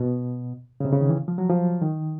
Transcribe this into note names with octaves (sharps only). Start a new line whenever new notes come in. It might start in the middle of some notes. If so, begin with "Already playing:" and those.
Already playing: B2
C#3
C3
C#3
D#3
E3
F3
F#3
F3
D#3